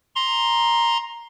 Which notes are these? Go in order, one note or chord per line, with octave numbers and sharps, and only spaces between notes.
A#5 C6